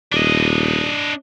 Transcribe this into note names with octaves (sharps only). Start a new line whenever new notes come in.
D#1 D4 D#5